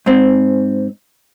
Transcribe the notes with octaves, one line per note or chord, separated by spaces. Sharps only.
G#2 C4